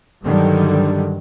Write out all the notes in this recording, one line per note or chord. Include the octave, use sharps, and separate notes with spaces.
G2 D3 D#3 F#3 G3